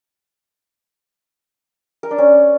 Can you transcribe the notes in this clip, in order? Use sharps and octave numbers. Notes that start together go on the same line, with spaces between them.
A#4
D4
C#4